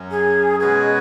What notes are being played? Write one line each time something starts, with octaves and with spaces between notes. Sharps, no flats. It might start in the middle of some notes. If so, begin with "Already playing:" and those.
Already playing: F#2 F#3 C#4
G#4
B2 G#3 C#4 F#4 G#4 B4